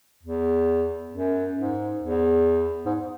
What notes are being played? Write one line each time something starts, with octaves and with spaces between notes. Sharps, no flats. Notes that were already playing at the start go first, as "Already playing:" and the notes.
E2
F#2
G#2
E2
G#2